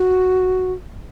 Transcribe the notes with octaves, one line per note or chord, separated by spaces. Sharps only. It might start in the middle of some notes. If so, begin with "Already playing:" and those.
Already playing: F#4